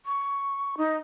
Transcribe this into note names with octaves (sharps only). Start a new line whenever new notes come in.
C#6
D#4